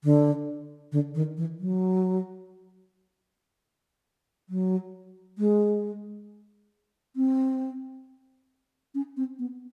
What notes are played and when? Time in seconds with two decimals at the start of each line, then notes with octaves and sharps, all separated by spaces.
0.04 D3
0.92 D3
1.15 D#3
1.37 E3
1.60 F#3
4.49 F#3
5.38 G#3
7.16 C4
8.95 C#4
9.17 C4
9.39 B3